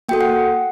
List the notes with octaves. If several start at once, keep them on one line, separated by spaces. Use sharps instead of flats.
A#3 F#4 A4 G5
F#5